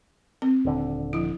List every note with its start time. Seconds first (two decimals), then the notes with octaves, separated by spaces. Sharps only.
0.42 C4
0.65 D#1 D3
1.13 F3 E4